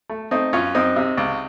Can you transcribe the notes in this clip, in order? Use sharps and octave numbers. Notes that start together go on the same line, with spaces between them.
A3
A3 C4 D#4
F#2 C#4 F4
F#2 C4 D#4
C3
C#2